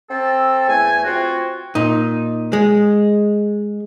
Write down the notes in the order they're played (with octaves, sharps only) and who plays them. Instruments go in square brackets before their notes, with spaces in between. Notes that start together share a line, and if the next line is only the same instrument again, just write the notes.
[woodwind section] C4 A4
E2 A3 G#5
C4 F4 F#4
[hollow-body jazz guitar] A#2 D#4
G#3